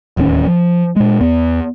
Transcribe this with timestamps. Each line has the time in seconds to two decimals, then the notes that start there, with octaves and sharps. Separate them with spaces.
0.17 D1 D#2 E3 C#4
0.47 F3
0.96 A#2 G#3
1.21 E2 B3